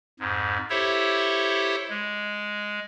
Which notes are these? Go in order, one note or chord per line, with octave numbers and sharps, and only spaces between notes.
F2 G#2
E4 G4 A4 C5 C#5 E5
G#3